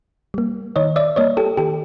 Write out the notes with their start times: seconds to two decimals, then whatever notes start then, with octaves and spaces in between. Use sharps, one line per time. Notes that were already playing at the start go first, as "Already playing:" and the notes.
0.34 G3 A#3
0.76 D#3 C#5 D#5
0.96 D5 E5
1.16 G3 A#3 C#5 D#5
1.37 G4 A4
1.57 D#3 G4 A4